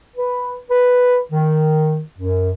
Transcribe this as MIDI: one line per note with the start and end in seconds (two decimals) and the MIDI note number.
0.17 0.54 71
0.70 1.17 71
1.32 2.02 51
2.19 2.51 42